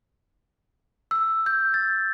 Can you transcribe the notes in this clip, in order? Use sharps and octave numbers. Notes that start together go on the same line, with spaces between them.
E6
G6
A6